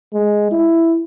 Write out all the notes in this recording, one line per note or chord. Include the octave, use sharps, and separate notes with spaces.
G#3
E4